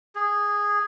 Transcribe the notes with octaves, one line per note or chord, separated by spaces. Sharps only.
G#4